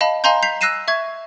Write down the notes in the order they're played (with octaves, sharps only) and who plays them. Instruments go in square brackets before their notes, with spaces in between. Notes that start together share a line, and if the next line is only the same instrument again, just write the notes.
[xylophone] D#5 F5 A5 B5
D#5 F5 G#5 A#5 C6 G6
G6 B6 C7 F7
E6 F#6 A#6 C7 D#7 E7
E5 C#6 G#6